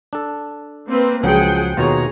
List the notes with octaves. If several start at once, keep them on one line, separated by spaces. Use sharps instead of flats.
D4 A4
A#3 C4 B4
C#2 F3 F#3 G#4 F#5 G5
D#2 B2 F4 G#4 C#5 A#5